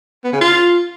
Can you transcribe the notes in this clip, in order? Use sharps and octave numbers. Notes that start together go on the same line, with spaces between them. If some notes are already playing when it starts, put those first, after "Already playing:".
B3
C#3
F4